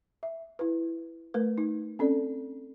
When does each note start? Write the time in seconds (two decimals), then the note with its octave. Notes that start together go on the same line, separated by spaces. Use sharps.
0.23 E5
0.59 E4 B4
1.34 A3 A#4 B4
1.58 D#4
1.99 C4 C#4 A4 D5